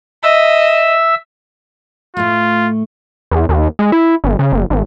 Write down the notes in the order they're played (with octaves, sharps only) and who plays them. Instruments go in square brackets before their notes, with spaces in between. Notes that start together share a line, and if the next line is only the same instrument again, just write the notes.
[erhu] D#5 [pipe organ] E5 E6
[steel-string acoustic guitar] A2 A3 [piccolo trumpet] F4
[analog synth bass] E2
D#2
G#3
E4
G1
C#3
F#1
G#1